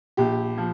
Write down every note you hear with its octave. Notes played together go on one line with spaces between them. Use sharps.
A#1 G4
F3